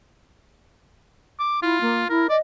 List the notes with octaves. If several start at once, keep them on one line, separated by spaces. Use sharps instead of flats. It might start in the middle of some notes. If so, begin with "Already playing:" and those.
D6
E4 F4
A#3
E4 A#4
D5 D#5